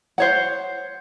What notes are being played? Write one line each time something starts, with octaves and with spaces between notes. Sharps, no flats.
C5 C#5 F#5